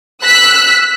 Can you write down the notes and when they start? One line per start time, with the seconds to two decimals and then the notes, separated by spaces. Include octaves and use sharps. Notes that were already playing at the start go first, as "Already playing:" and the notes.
0.22 E6 F#6 B6